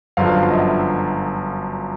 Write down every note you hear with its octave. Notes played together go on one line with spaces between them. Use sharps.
G1 F#2 D3 F3 F5
D#5
E5